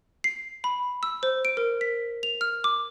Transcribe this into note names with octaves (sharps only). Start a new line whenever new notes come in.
C7
B5
E6
C5
D7
A#4
B6
F7
F6
D6